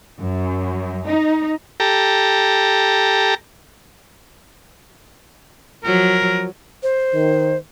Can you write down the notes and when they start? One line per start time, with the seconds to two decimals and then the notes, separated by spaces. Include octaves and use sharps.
0.21 F#2
1.07 D#4
1.80 G4 A4 A#5
5.84 F3 F#3 A#4
6.83 C5
7.13 D#3